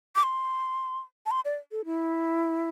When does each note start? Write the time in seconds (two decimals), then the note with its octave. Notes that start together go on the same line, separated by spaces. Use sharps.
0.15 D6
0.23 C6
1.26 A5
1.31 C6
1.45 D5
1.71 A4
1.85 E4